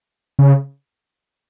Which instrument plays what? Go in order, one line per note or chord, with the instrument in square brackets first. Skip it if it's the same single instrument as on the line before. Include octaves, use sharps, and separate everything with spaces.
[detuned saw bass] C#3